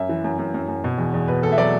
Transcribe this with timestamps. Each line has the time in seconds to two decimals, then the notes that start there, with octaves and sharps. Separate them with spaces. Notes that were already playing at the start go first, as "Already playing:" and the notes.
Already playing: F#2 E5
0.09 E3
0.24 F#2
0.39 F#2
0.54 F#2
0.68 F#2
0.84 B2
0.98 E2
1.14 E2
1.28 B2 B4
1.42 E2 A4
1.52 E5
1.58 F#3 D5